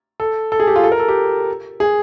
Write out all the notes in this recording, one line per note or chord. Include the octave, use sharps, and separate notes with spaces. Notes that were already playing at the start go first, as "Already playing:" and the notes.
A4
A4
G#4
G4
F4
A4
A#4
A4
G4
G#4